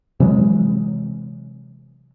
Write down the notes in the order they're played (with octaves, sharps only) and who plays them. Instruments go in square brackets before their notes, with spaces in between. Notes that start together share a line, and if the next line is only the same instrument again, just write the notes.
[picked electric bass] C3 E3 F#3 G#3